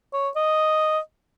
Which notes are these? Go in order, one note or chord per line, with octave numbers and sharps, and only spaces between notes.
C#5
D#5